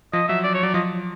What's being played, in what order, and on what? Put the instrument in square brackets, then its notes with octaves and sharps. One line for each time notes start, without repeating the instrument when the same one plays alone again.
[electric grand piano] F3 [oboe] D#5
[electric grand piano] F#3 [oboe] E5
[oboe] D5
C#5
[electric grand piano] F#3 [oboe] D5
[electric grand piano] F3 [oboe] D#5